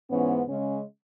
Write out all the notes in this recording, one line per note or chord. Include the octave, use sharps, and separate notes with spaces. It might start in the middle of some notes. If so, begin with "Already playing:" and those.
G#2 E3 B3 C#4 C#5
C#3 G#3 C#4